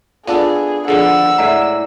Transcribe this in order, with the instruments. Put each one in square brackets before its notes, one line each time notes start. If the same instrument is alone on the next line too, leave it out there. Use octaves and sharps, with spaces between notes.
[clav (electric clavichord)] B3 D4 A4 [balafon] F4 D5 F5 [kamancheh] G#4
[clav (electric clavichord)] D3 F3 B3 [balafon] D4 G#4 A4 [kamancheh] F#5 E6
[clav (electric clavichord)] A2 G#3 E5 [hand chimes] D5 A#5